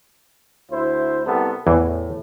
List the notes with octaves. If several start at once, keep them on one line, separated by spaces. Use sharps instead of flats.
D2 E4 C5
C2 B3 A4
E2 A2 E3